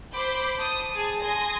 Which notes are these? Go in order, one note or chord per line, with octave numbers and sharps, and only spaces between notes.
C5 B5 D6 G6
A5 D#6
G#4 A5
G#5 C6 D#6 A#6